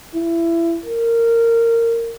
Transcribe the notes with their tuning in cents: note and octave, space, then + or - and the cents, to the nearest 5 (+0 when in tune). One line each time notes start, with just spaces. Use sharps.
E4 +25
A#4 -15